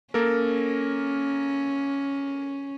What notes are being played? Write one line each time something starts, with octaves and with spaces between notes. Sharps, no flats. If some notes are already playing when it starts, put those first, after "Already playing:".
A#3 C#4 A4 A#4